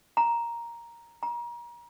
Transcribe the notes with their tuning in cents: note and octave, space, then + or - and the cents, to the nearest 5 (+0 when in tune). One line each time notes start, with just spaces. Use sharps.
A#5 +5
A#5 +35